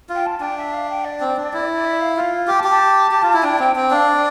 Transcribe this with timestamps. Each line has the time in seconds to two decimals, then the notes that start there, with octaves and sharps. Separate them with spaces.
0.09 F4
0.15 G5
0.25 A5
0.40 D4 G5
0.57 E5
0.73 F5
0.89 G5
1.04 D5
1.20 C4
1.37 D4
1.53 E4
1.75 D5
1.85 E5
2.00 F5
2.16 F4 F5
2.47 G4 G5
2.59 A5
2.64 G4
2.70 A5
3.11 G4
3.23 F4
3.33 E4
3.43 D4 G5
3.59 C4 G5
3.76 C4 G5
3.91 D4 F5
4.07 D5